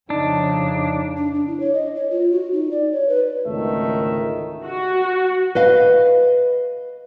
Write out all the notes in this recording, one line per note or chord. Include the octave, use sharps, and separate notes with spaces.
F2 C#3 D4 D#4
D4
D4
E4
C#5
D#5
C#5
F4
F#4
D#4
D5
C#5
B4
G#1 C#2 D3 D#3 A3 E5
F#4
B4 D#5 F5